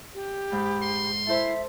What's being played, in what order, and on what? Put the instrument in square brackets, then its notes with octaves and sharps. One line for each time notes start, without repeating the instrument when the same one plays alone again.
[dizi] G4
[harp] G#2 [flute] B5
[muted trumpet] C6
[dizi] E4 [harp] A4 C5 [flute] E5